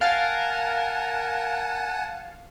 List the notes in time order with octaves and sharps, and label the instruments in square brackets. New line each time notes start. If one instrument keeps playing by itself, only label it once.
[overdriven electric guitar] A#4 [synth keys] F5 A6 [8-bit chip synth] F#5 G#5 A5